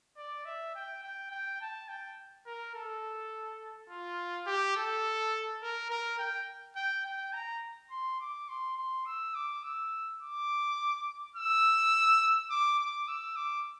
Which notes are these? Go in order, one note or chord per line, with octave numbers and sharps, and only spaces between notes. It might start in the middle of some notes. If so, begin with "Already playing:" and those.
D5
E5
G5
G5
G5
A5
G5
A#4
A4
F4
G4
A4
A#4
A#4
G5
G5
G5
A#5
C6
D6
C6
C6
E6
D6
E6
D6
E6
D6
D6
E6
D6